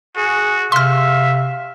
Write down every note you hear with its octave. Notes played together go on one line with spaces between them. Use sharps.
F#4 G#4
C3 E5 F5 C6 F6